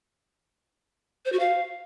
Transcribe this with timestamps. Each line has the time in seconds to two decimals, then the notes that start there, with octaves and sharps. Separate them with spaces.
1.25 C5
1.32 F#4
1.39 F5